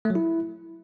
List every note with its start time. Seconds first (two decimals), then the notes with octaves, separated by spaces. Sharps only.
0.05 A3
0.10 F#3
0.15 E4